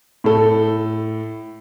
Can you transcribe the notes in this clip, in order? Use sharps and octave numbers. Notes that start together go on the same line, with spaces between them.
A2 A4